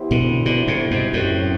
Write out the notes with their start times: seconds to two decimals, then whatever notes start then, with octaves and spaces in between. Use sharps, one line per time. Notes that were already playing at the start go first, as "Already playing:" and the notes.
Already playing: E3 B3 E4 G4 C5
0.11 B2 D3
0.45 B2 D3
0.68 A2 C3
0.91 G2 B2
1.13 F#2 A2 D3 F#3 C4